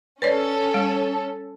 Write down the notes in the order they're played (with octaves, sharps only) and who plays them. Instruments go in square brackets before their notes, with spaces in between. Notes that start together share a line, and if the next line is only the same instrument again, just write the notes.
[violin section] C#4 A4 [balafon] B4 C#5 D5
[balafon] G3